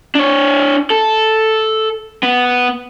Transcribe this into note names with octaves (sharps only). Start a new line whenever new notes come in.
D4 C#5
A4
B3